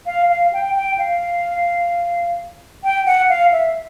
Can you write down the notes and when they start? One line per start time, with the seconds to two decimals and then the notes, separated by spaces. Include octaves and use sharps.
0.06 F5
0.29 F5
0.53 G5
0.75 G5
0.98 F5
2.84 G5
3.06 F#5
3.29 F5
3.52 E5